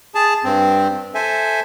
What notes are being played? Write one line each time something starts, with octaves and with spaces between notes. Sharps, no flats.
G#4 A5
G2 C4
A4 C5 E5 G#5